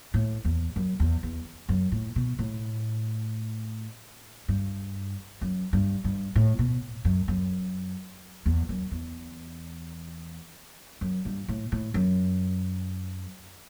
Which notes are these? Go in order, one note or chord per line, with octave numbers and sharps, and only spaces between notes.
A2
E2
F#2
E2
E2
F#2
A2
B2
A2
G2
F#2
G2
G2
A2
B2
F#2
F#2
E2
F#2
E2
F#2
G2
A2
A2
F#2